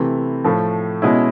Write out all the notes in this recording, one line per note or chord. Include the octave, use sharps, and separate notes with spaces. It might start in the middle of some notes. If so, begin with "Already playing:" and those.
Already playing: C3 E3 A3
A2 F3 A3
B2 G#3 C#4 E4